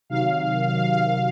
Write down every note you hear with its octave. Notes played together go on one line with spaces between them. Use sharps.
C3 D#3 F#3 F5
C3 D#3 F#3